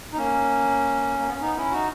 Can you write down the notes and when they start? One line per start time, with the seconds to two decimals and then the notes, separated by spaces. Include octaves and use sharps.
0.13 D#4
0.18 A#3 C#4
1.19 A#3
1.26 B3
1.34 C#4
1.41 B3 D#4
1.57 C#4 E4
1.72 D#4 F#4